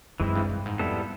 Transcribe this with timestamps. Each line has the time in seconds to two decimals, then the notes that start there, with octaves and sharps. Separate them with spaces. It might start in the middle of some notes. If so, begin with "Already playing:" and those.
0.20 F#2 E3 G#3 C4 E4
0.35 G2
0.50 G2
0.66 G#2
0.79 F2 G3 B3 E4 A4